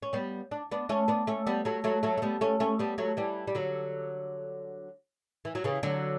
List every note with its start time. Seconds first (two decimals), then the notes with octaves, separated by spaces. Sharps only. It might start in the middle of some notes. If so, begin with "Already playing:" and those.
0.03 C#4
0.13 G3 B3
0.51 D4
0.71 B3 D4
0.89 A3 C#4
1.08 B3 D4
1.27 A3 C#4
1.47 G3 B3
1.65 F#3 A3
1.84 F#3 A3
2.03 F#3 A3
2.18 A3
2.22 G3 B3
2.41 A3 C#4
2.60 A3 C#4
2.79 G3 B3
2.98 F#3 A3
3.17 E3 G3
3.48 G3
3.55 D3 F#3
5.45 E3
5.55 F#3
5.64 C#3 E3
5.83 D3 F#3